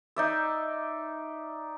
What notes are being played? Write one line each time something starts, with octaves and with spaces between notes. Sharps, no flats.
D#4 D5 E5